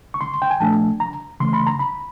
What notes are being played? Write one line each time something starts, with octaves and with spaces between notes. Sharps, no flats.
C#6
C6
G5
G#5
A#2 F3 A3 D4 A5
A#5
C#3 E3 A3 C6
B5
A#5
B5